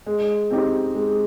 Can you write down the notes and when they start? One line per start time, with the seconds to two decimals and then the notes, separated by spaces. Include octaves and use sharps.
0.06 G#3
0.51 C4 D#4 G4
0.95 G#3